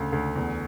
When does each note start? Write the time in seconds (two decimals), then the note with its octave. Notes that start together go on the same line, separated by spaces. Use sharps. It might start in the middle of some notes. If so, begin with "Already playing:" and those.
Already playing: D2 C#3
0.12 D2
0.36 E2